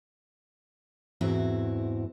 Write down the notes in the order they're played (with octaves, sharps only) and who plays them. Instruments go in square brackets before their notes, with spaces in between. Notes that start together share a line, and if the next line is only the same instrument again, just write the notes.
[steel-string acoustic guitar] E2 G#2 C4 E4 F#4